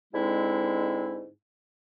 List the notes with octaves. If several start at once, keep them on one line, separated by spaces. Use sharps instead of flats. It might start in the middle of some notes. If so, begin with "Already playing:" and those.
G#2 D3 G#3 C4 E4